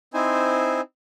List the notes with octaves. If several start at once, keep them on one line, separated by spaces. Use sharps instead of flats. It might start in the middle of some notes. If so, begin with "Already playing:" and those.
C4 D#4 E4 C5 G#5